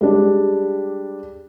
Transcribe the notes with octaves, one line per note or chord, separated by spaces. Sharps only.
G3 G#3 D4